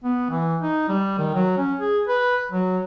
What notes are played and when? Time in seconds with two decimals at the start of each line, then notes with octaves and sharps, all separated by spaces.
0.04 B3
0.30 E3
0.61 D#4
0.88 G3
1.19 D#3
1.35 F#3
1.58 C#4
1.80 G#4
2.07 B4
2.52 F#3